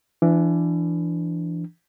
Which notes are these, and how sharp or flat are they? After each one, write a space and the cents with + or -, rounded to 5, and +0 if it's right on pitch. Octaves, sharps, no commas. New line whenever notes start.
E3 +30 D4 +0